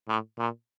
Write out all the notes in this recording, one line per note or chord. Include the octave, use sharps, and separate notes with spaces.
A2
A#2